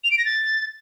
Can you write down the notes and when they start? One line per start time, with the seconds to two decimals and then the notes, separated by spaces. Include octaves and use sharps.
0.04 F7
0.11 D7
0.18 A#6
0.25 A6